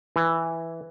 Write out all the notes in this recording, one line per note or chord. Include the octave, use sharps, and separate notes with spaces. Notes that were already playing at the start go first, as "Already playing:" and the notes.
E3